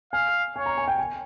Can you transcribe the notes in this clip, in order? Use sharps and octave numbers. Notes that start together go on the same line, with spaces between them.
F5 G#5
C#5 G#5
A#5
G#5
G5
G#5